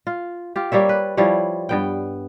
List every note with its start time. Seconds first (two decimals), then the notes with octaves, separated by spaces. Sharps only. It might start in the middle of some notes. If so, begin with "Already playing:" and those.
0.07 F4
0.56 F4 G4
0.72 G3 A#3 C#5 E5
0.89 B4
1.17 F3 G3 E4 C#5
1.69 G2 B3 G5